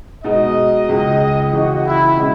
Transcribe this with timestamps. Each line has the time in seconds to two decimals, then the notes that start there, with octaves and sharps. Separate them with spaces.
0.24 B2 G#3 D#4 D#5
0.89 C#2 C#3 G#3
1.53 C#2 C#3 E3 F#4
1.85 E4
2.17 B2 G#3 C#4